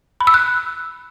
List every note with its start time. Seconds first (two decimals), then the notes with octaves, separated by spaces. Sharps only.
0.21 B5
0.27 E6
0.34 F#6